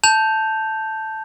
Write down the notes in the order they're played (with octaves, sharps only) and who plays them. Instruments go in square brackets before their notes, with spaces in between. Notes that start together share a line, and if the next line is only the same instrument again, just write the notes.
[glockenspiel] A5 G6 F7